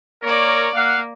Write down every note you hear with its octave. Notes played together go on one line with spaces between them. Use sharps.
A#3 A#4 C#5 D5
A#3 F5 F#5